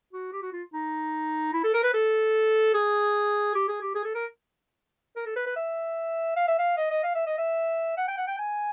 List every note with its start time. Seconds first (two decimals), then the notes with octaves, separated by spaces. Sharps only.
0.13 F#4
0.32 G4
0.42 F#4
0.52 F4
0.73 D#4
1.53 E4
1.64 A4
1.74 A#4
1.84 B4
1.94 A4
2.74 G#4
3.55 G4
3.68 G#4
3.81 G4
3.95 G#4
4.05 A4
4.15 A#4
5.16 A#4
5.26 A4
5.36 B4
5.46 B4
5.56 E5
6.36 F5
6.48 E5
6.59 F5
6.77 D#5
6.91 D#5
7.03 F5
7.15 E5
7.26 D#5
7.38 E5
7.97 F#5
8.08 G5
8.18 F#5
8.27 G5
8.38 G#5